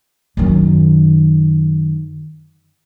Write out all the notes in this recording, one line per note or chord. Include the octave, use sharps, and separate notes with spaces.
F#2 D#3